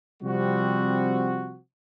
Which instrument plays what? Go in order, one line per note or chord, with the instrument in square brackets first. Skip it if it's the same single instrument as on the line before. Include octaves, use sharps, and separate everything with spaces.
[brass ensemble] C3 F3 G3 C4 F#4